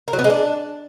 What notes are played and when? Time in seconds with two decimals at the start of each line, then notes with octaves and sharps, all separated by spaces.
0.08 A#4
0.13 F#3
0.19 B3
0.24 G#3
0.30 D4